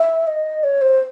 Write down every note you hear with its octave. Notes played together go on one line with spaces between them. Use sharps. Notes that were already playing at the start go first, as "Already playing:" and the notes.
Already playing: E5
D#5
C#5
C5